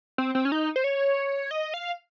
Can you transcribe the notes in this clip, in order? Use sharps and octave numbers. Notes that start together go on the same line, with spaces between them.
C4
C4
C#4
D#4
C5
C#5
D#5
F5